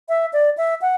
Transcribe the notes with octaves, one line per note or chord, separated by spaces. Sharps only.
E5
D5
E5
F#5